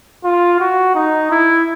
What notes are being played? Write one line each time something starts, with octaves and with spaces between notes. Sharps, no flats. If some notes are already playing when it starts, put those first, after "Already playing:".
F4
F#4
D#4
E4